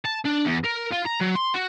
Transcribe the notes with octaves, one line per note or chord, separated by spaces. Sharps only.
A5
D4
E2
A#4
F4
A#5
F#3
C6
F#4